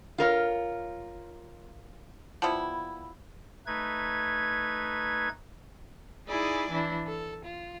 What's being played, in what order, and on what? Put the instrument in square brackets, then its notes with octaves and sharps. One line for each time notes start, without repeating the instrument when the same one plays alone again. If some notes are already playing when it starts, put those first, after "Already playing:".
[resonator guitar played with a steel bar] F4 A#4 C#5
[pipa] F3 G3 B3 E4
[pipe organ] A3 D#4 B4 G#6
[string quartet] D#4 E4 G#4 D5 G#5
E3 D4 E4
A4
F4